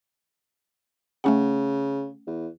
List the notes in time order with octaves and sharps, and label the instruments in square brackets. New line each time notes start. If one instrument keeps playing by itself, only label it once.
[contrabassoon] C#3 [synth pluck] A3 C#4 F#5
[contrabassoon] E2